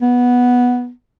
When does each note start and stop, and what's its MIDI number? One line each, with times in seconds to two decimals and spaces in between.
0.02 0.90 59